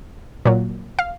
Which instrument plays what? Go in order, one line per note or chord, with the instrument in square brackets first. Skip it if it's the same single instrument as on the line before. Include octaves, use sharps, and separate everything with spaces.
[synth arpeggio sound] A#2 F#3
F5